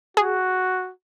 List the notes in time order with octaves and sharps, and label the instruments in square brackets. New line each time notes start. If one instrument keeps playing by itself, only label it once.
[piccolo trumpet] F#4 [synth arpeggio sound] G#4